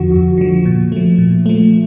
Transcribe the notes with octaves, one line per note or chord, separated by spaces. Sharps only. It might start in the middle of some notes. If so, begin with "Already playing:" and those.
Already playing: F2 D3 F3 F#4
F2
D3 F3
A#2
F3 A3
A#2
F3 A3